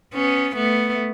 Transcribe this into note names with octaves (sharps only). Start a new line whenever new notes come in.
B3 C#4
A3 B3